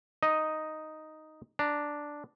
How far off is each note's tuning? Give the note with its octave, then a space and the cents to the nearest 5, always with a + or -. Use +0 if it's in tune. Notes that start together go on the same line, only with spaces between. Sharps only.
D#4 +0 D#5 +0
D4 +0 A#5 -10